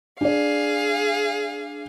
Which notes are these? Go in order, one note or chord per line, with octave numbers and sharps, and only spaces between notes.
D4 G#4 D5 F5